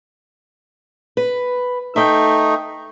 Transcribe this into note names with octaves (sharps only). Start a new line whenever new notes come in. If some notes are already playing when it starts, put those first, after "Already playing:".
B4
A3 D#4 E5 G5